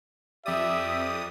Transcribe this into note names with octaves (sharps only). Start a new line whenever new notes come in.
F2 G4 D5 E5 D#6